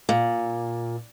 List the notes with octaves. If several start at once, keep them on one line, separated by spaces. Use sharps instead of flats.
A#2